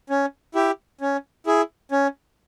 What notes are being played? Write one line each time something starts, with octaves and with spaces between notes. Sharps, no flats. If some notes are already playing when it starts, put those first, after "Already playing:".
C#4
E4 G4
C#4
E4 G#4
C#4